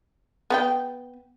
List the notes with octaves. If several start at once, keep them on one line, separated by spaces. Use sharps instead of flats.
B3 B4 G5